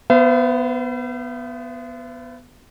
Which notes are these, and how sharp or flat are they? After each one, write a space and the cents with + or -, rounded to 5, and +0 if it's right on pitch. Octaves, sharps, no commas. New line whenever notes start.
B3 +0 C5 -40 E5 +45